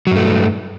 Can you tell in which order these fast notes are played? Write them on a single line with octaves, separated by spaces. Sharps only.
F#3 G2 A3